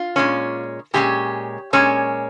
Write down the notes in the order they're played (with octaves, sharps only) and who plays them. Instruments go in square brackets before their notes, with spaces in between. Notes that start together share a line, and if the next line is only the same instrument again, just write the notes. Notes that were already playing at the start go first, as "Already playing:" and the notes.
Already playing: [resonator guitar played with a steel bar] F4
A#2 G#3 C#4
A#2 G#3 C#4 G4
A#2 G#3 C#4